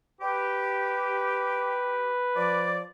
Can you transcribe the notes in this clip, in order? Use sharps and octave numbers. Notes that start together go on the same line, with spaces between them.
G4 B4
F3 D5